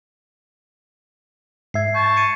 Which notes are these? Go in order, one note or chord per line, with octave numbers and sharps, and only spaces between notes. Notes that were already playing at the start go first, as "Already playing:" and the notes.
G#2 E5 G#6 C7
A5 C#6 G6
G#6 C#7 D#7